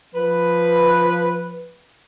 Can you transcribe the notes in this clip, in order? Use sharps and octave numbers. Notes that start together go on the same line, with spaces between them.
F3 B4